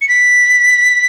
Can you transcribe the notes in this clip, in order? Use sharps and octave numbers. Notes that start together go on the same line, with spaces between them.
C#7
B6